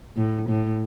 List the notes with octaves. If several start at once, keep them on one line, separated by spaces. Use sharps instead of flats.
A2
A2